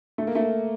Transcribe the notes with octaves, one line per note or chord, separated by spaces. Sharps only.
A3
A#3
A3